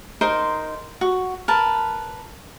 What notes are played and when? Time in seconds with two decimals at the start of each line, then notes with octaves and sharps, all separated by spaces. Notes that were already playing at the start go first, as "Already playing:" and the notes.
0.21 D#4 A#4 C5 C6
1.01 F#4
1.48 A#4 B4 A5